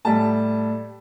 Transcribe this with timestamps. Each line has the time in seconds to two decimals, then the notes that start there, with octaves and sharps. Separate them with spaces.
0.05 A2 G3 A5